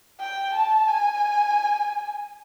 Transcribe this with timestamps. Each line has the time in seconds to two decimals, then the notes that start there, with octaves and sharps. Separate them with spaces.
0.20 G5
0.54 A5
0.88 G#5